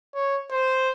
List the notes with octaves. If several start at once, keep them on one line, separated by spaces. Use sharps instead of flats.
C#5
C5